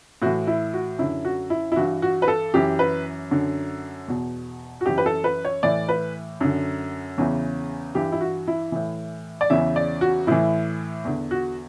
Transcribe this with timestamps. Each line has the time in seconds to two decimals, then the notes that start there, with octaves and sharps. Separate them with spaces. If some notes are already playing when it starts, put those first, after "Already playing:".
0.22 A2 E3 F#4
0.47 E4
0.73 F#4
0.99 F#2 D3 E4
1.25 F#4
1.50 E4
1.72 E4
1.76 G2 E3 F#4
2.02 F#4
2.22 B4
2.28 A4
2.54 F#2 E3 G4
2.79 B4
3.31 F#2 D3
4.08 E2 B2
4.81 F#4
4.86 F#2 E3 G4
4.98 B4
5.06 A4
5.24 B4
5.45 C#5
5.63 A2 E3 D5
5.89 B4
6.41 F#2 D3
7.18 E2 C#3 E3
7.95 G2 E3 G4
8.12 E4
8.21 F#4
8.48 E4
8.72 A2 E3
9.41 D5
9.50 E2 C#3 E3 E5
9.76 D5
10.01 F#4
10.27 A2 E3 E4
11.05 E2 D3
11.31 F#4